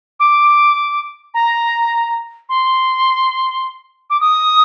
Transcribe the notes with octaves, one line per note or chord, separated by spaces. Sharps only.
D6
A#5
C6
D6
D#6